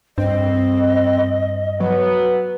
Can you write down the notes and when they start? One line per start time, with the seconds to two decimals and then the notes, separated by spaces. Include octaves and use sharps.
0.18 G2 C4 D#5
1.80 F#3 B3